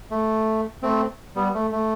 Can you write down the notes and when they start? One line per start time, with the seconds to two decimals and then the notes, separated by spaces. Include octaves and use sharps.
0.11 A3
0.83 A3 C4
1.36 G3 B3
1.54 A3
1.72 A3